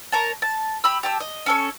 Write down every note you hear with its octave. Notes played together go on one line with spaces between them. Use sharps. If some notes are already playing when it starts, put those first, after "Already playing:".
A#4 C#5 A5
A5
G4 B5 E6
G4 A5 E6
D#5
C#4 A4 C#5